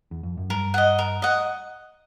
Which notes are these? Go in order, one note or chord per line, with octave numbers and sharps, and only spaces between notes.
E2
F2
F#2
G2 A#4
D#5 F#5
A#4
D#5 F#5